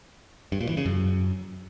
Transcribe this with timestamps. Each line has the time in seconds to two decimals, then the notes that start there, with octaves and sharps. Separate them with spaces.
0.52 G2
0.60 A#2
0.69 E3
0.77 C#3
0.85 F#2